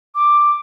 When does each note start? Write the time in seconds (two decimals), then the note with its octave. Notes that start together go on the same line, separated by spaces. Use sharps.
0.15 D6